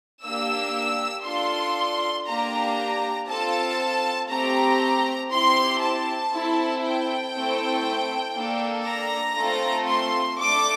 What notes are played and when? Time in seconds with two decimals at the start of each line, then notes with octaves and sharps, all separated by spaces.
0.24 A#3 D4 G4 E6
1.26 D4 F4 A4 C6
2.27 A#3 D4 G4 A#5
3.29 C4 F4 A4 A5
4.30 A3 C4 G4 A#5
5.31 C4 E4 G4 C6
5.82 A5
6.33 C4 E4 A4
6.84 G5
7.34 A3 C4 E4 A4
8.36 A#3 D4 A4
8.86 A#5
9.37 A3 C4 F4 A4
9.88 C6
10.39 A3 D4 A4 D6